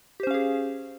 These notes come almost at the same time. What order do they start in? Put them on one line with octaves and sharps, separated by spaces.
G4 C5 C#4 F5 G#4